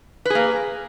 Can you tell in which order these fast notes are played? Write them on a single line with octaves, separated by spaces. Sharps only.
B4 G#4 A#3